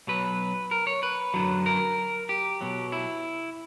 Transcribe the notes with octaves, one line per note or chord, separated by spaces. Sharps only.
B1 B2 F#3 B4
A#4
C#5
B4
F#2 D3 F#3
A#4
G4
B1 B2 F#3
E4